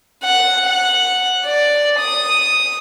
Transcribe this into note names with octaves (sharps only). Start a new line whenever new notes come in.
F#5
F#5
D5
D#6